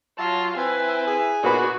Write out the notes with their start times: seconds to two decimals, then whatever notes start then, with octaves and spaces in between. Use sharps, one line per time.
0.18 F#3 F4 A5
0.57 C4 E4 B4 E5 G#5
1.07 G#4
1.43 A#2 B3 D4 D#4 F#4 B4